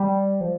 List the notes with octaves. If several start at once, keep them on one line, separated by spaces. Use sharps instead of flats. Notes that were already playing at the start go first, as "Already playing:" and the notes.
Already playing: G3
F3